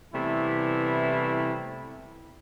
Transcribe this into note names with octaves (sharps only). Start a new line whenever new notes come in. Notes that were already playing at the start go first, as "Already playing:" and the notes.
C3 E3 G3 A3 B3 E4